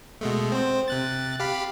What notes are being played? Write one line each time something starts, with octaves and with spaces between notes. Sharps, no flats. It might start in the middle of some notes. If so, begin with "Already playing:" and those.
B2 G#3 A3
C4 C5
C3 F#6 A6
G4 F5 B5